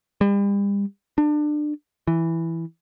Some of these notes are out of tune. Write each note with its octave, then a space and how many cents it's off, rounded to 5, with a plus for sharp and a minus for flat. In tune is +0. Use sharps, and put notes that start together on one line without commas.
G3 +40
D4 +25
E3 +0